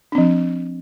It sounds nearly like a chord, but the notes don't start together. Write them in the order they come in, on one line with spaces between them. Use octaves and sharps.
D4 C4 F3